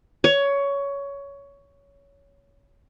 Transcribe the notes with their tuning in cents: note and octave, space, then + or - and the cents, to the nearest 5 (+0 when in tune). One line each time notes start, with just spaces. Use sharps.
C#5 +15